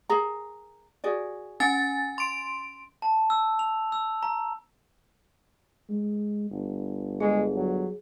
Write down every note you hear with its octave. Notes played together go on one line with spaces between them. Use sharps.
G#4 A#4 A#5
F#4 G#4 D5
C#4 G#5 A6
C6 D7
A5
E6
F7
E6
A#5
G#3
G1
G#3 G#4
F#3